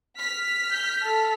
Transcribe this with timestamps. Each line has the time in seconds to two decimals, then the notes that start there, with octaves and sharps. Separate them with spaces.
0.18 F6 B6
0.71 G6
1.03 A4